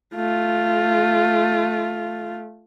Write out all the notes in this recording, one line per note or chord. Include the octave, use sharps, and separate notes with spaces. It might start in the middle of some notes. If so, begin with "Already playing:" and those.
A3 F4